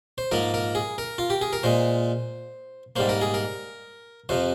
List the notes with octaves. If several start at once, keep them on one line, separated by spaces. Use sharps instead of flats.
C5
G#2 F3 A#3 A#4
A#4
G#4
A#4
F4
G4
G#4
A#4
A#2 G#3 C5
G#2 G3 A#3 C5
A#4
G#4
A#4
F2 C3 F3 C5